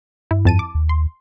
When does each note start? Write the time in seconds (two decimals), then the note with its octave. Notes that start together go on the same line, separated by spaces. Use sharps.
0.31 G2 E4
0.45 F2 A5 D#7
0.59 D6
0.75 D#2
0.89 C6